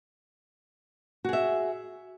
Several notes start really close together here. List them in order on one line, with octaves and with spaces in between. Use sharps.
F#4 G#4 E5